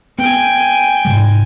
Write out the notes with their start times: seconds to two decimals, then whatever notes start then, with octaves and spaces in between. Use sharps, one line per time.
0.19 B3 G5 G#5
1.05 G#2 C3 G3